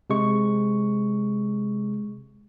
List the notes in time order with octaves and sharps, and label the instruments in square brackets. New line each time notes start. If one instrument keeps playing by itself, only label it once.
[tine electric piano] C3 G#3 C#6